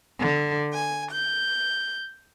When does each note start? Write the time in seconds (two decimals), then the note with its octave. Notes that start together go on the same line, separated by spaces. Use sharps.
0.20 D3
0.73 G#5
1.12 G6